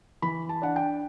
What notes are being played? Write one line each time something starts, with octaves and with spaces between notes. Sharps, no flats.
E3 B5
A5
D4 F#5
G5